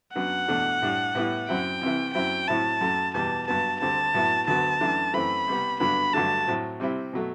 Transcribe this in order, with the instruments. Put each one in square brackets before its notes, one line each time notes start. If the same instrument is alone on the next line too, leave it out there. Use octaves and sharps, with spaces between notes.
[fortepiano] F#2 F#3 B3 D4 [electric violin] F#5
[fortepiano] E2 B2 A3 D4
A2 G3 D4
A2 G3 B3 E4
[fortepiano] F#2 F#3 C4 E4 [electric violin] G5
[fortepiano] C2 C3 E3
[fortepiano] F#2 F#3 C4 E4 [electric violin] G5
[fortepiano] A2 F#3 C4 E4 [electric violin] A5
[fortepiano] F#2 F#3 A3
[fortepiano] E2 B2 G3 B3 [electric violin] A5
[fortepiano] G2 F#3 B3 [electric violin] A5
[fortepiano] D2 D3 G3 C4 [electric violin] A5
[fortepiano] A2 F#3 B3 E4
[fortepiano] D2 D3 F#3 B3 [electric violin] A5
[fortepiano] F#2 E3 A3 D4
[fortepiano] F#2 E3 A3 C4 [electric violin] B5
[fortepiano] C2 C3 G3 B3
[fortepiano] G2 D3 F#3 B3 D4 [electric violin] B5
[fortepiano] G2 D3 F#3 A3 D4 [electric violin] A5
[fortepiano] A2 F#3 C4
C3 G3 C4 E4
B2 F#3 A3